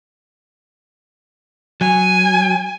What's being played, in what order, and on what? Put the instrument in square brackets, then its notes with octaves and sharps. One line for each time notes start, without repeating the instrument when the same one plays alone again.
[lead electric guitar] F#3 [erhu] G#5